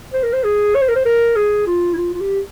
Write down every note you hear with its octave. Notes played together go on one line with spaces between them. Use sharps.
C5
A#4
C5
G#4
C#5
C5
A#4
C5
A#4
G#4
F4
E4
F4
F4
G4